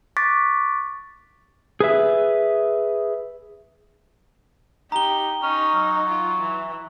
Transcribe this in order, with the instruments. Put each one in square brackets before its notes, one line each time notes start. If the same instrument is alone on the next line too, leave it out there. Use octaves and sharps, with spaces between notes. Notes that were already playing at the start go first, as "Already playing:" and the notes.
[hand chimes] C#6 D6 F#6 A6 B6 D7
[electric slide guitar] G#4 B4 E5
[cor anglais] D#4 [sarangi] G4 [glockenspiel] A#5 G7
[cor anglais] C#4 [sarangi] D#4
[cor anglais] F#3
[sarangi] F4
E3